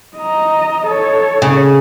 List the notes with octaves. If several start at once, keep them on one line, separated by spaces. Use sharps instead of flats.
D#5 A#5
A4 C#5
C#3